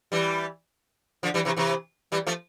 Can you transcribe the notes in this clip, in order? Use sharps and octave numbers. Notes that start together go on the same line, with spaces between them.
E3 G3
D3 F3
E3 G3
C3 E3
C3 E3
E3 G3
F3 A3